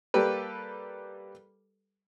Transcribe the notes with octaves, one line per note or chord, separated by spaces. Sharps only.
G3 A#3 G4 A4 B4